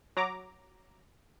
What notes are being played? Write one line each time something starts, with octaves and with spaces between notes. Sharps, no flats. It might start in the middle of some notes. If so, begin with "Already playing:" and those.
F#3 A#5 D6